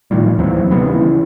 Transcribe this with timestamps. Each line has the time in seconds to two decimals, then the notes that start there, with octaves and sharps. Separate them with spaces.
0.11 A2 D#3 F3 G3
0.38 D#2 E3 F#3 C4
0.70 C3 D#3 G3 B3
0.86 C#3 E3